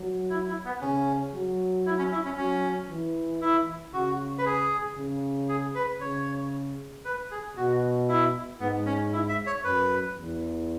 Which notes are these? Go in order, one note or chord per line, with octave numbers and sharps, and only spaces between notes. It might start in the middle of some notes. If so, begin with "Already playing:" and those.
Already playing: F#3
E4
E4
B3
C#3 C#4
F#3
E4
C#4
E4
C#4
F#3 C#4
E3
E4
C#3 F#4
B4
G#4
C#3
G#4
B4
C#3 C#5
B4
G#4
B2 F#4
E4
G#2 B3
C#4
E4
E5
C#5
F#2 B4
E2